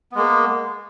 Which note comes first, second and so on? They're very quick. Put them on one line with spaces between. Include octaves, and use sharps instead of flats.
B3 G#3 A#3